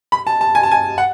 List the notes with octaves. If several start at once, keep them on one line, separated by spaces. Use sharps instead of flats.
B5
A5
A5
G#5
A5
G#5
F#5